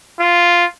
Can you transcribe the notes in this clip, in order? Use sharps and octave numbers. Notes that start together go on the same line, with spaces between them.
F4